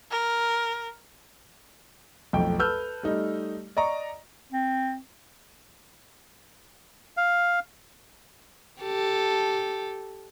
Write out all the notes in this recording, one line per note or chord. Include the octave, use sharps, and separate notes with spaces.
A#4
B1 F2 A3 G5
A4 B4 E6 F6 G6
G3 A3 D#4
D5 D#5 A#5 C#6
C4
F5
G4 A4